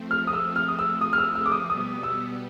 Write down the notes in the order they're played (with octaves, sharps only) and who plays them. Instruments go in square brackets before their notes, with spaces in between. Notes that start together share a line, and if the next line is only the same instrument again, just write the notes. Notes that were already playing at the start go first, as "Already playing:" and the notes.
Already playing: [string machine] F3 A3 C4
[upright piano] F6
D#6
E6
F6
D#6
E6
D#6
F6
E6
E6
D6
D#6
[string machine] B2 G3 B3 [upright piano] D#6
[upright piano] E6